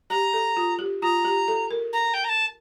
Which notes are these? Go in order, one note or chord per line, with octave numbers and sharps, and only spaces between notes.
G4 A#5
A4
F4
G4
F4 A#5
G4
A4
A#4
A#5
G5
A#5
A5